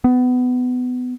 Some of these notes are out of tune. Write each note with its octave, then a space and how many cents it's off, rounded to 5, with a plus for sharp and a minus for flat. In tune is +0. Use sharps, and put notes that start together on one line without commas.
B3 +20